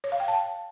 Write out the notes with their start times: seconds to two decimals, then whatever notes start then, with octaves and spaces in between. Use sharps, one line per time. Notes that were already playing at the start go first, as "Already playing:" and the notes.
0.04 C#5
0.12 F5
0.20 G5
0.28 A5